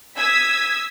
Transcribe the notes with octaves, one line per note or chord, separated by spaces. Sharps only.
D#6 E6 G#6 B6